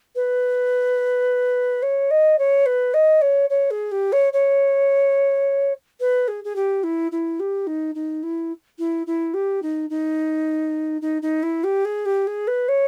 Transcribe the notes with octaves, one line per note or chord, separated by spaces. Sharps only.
B4
C#5
D#5
C#5
B4
D#5
C#5
C#5
G#4
G4
C#5
C#5
B4
G#4
G#4
G4
E4
E4
G4
D#4
D#4
E4
E4
E4
G4
D#4
D#4
D#4
D#4
E4
G4
G#4
G4
G#4
B4
C#5